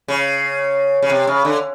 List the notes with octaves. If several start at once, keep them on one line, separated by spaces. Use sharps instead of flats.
C#3
C#3
C3
C#3
D3